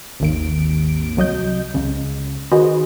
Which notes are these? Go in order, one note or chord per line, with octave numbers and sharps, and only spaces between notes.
G#1 D#2 D7
C2 F#3 D#5 G6
C#2 C#3
D#3 F#4 G#4 B4 C5 D#5